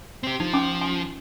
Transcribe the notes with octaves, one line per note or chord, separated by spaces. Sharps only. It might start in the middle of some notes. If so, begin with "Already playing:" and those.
C4 G4
F3 D#4
C#4 G#5 D6
G#5